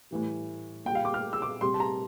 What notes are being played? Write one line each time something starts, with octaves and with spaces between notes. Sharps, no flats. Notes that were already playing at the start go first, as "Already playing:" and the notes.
A2 E3 G3
A#2 G3 G5
F5
D6
F6
E6
D6
C3 G3 C6
A5
A#5